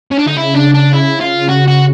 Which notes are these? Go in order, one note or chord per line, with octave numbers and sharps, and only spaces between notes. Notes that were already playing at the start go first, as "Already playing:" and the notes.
C#4
D4
D3 D#4
C#3 E4
D4
D4
E4
F4
F#4
F#4